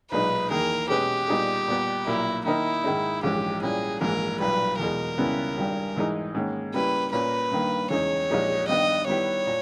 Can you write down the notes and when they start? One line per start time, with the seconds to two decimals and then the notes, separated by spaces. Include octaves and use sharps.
0.11 B1 A#2 G#3 D#4 B4
0.50 E2 D#3 A#3 E4 G#4 A#4
0.89 B2 G#3 C#4 G4 G#4 B4
1.28 A#2 G3 B3 D#4 G#4
1.68 A#2 G3 B3
2.06 B1 A#2 A#3 E4
2.46 D#3 A#3 D#4 E4 A#4
2.84 G#2 D#3 G#3 D#4
3.23 A#1 G#2 E3 G#3 C#4 G4
3.62 A#2 G3 C#4 E4 G#4
4.01 A#1 G#2 E3 A#3 E4 A#4
4.40 B1 A#2 G3 B4
4.79 E2 B2 G#3 A#4
5.18 C#2 C#3 G3 B3 E4
5.57 G#1 G2 G3
5.96 G#2 E3 G#3 D#4
6.35 G#2 D#3 A#3 C#4
6.74 C#3 G3 A#3 E4 G4 B4
7.12 A#2 A#3 C#4 B4
7.51 G2 D#3 A#3
7.90 E2 C#3 G#3 D#4 C#5
8.30 A#1 A#2 G#3 D#4 G4
8.68 G2 D#3 G3 B3 D#5
9.07 D#3 G3 B3 E4 G4 C#5
9.47 A#2